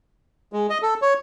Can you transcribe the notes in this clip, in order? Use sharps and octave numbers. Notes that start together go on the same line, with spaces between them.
G#3
D#5
A4
C#5